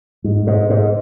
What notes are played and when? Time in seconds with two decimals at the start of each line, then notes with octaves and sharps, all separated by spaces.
0.24 G#2
0.47 G#2
0.70 G#2